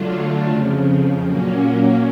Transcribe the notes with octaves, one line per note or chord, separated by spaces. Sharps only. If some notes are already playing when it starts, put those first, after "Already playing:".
Already playing: D3 F#3 A3 D4 F4
F2 C#3 F3
A#2 F#3 A#3 C#4